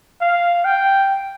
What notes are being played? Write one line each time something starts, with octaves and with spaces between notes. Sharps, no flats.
F5
G5